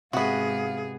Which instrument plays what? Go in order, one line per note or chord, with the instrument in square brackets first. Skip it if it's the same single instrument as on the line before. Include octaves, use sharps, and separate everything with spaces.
[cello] G#2 G#4 [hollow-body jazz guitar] C3 [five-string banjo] B3 F#4 [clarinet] F5